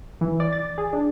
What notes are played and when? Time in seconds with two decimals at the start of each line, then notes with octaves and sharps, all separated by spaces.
0.21 E3
0.40 D5
0.53 A6
0.78 G#4
0.93 D4